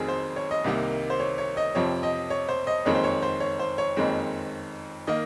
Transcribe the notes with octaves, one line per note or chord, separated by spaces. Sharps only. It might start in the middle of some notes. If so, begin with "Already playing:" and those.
Already playing: F1 F2 D#3 F#3 C4 G#4 A#4
C5
C#5
D#5
C2 C3 D#3 A#3
C5
C#5
C#5
D#5
F2 C3 F3 C4 C#5
D#5
C#5
C5
D#5
F#1 F2 D#3 G#3 C4 C#5
C5
C#5
C5
C#5
C5
C#5
F#1 F2 D#3 G#3 C4
D#3 A#3 D#5